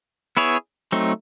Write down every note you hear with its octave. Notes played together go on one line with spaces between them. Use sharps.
B3 E4 G#4 C#5
F#3 A3 C4 D#4